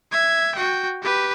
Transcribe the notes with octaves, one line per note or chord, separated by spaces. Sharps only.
E5 G#6
F#4 G5
G4 B4